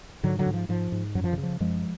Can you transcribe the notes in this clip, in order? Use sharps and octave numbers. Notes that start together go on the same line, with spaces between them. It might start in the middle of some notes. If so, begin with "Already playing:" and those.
G#2 D3 F#3
D3 F#3
G#2
F3
G#2 F3
G#2
F#2 F#3
F3
D3
C#3
F3
F#2 F3 G#3